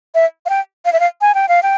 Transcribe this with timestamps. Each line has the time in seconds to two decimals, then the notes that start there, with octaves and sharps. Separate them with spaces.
0.15 E5
0.46 F5
0.50 G5
0.85 F5
0.93 E5
1.00 F5
1.21 G#5
1.35 G5
1.49 F5
1.63 G5